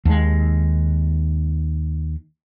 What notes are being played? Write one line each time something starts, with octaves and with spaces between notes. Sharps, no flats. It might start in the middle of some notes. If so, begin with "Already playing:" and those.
D#2 G#3